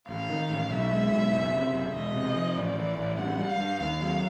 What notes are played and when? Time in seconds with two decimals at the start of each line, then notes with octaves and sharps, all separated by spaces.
0.08 A1 F5
0.29 D#3
0.50 A1
0.71 B1 E5
0.91 G#3
1.11 B1
1.32 F#1
1.52 C3
1.73 F#1
1.94 E1 D#5
2.14 C3
2.36 F3
2.56 A1 D5
2.77 E3
2.98 A1
3.18 G2 F#5
3.39 G3
3.49 F5
3.59 G2
3.81 D#2 F5
4.01 F#3